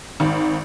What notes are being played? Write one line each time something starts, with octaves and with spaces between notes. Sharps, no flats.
G#1